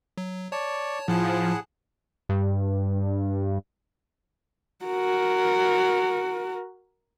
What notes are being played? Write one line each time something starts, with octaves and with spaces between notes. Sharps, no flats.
F#3
C#5 D5 A5 C#6
A2 F3 E4 G#4 F#5 A5
G2
F#4 A#4